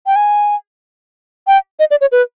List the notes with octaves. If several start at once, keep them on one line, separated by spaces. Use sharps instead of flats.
G5
G#5
G5
D#5
D5
C#5
B4